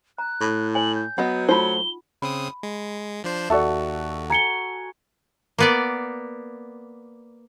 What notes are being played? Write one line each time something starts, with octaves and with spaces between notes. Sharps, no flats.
A#5 F#6
A2
C#5 G#5 F#7
G6
F#3 B3 D#5 F#5 B5
A3 D#4 F4 C5 B5 G7
C#3 C4 B5 D#6
G#3
F3 D4 C5
D#2 F#4 A4 D5 E5
G#5 A#5 C#7 G7
A#3 B3 D5